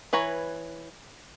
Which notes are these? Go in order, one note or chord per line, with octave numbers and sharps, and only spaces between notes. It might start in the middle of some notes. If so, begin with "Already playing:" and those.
E3 B4 C#5 A#5